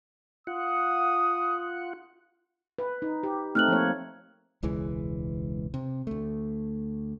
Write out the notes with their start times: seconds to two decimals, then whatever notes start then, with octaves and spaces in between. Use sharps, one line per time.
0.47 F4 F#5 D#6
2.79 B4
3.02 D#4
3.23 G4
3.55 A3 C4 D#4 F6 F#6 F#7
3.68 F3 A#3 C#5
4.63 E1 C#2 E3 G#3
5.74 C3
6.07 D2 A3